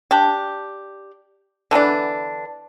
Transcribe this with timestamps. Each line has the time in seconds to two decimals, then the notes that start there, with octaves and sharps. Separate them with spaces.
0.11 D4 G4
1.71 D3 E3 B3 D4